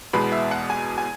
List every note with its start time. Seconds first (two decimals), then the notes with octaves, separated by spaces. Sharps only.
0.13 E2 B2 G#3 B3 B5
0.32 E5
0.51 F#5
0.70 G#5
0.98 G#5